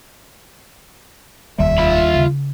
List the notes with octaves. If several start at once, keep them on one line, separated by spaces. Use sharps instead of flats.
F1 D#2 G3 E5
F4 B5
C#3 D#4